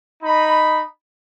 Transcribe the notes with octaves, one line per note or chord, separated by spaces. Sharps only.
D#4 B5